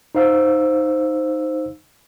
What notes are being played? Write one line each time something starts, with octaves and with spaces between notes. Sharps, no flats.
D#4 C5 F5 E6